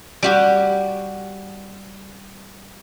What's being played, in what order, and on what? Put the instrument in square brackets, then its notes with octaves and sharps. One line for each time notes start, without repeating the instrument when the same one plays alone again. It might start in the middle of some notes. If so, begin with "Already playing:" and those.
[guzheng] G3 F#4 G4